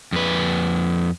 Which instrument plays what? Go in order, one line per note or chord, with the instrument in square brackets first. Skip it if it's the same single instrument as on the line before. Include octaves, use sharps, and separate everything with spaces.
[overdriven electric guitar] F2 B4